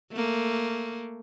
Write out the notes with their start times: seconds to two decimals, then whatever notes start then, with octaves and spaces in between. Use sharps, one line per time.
0.12 A3 A#3